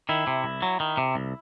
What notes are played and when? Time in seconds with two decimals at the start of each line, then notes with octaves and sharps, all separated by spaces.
0.09 D#3 E4
0.27 C3
0.44 C2
0.62 F#3
0.80 D#3
0.97 C3
1.15 C2